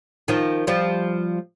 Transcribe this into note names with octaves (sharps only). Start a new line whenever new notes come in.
D#3 F3
F3 G3